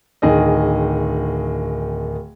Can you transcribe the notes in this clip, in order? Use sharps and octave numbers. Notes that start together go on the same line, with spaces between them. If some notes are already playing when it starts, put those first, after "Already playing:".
D1 D#3 G#4 D#5